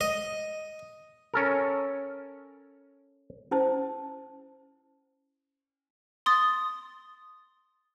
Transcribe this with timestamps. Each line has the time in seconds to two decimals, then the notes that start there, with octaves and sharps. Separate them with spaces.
0.01 D#5
1.34 C#4 A4 A#4
3.51 C#4 E4 C5 A5
6.26 C6 D#6 A6